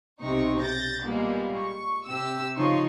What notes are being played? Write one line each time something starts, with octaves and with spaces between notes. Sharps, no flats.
B1 C3 C4 D#4 C#6
G6 A6 A#6
A#2 G3 G#3 A#3 B3
C#6
C3 G4 E6
C#3 F3 D#4 C#5 C6 C#6